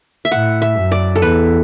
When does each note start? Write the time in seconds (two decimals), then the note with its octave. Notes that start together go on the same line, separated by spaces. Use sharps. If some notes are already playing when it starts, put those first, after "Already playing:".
0.25 E5
0.32 A2 F#5
0.62 E5
0.77 F#2
0.92 D5
1.16 A4
1.22 E2 B4